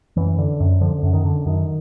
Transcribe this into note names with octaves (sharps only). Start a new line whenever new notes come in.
F#2 E3
D3
F#2
D3 F3
F#2
D#3
D3
F#2 D#3